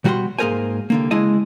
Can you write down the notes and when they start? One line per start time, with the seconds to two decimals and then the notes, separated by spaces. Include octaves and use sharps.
0.04 B2 G3 F#4 G#4 F#5 C6
0.39 G#2 A#3 G#4 A#4 C5 G#5
0.90 C2 D3 A#3
1.11 C#3 G#3 E4 D#5 G#5 A5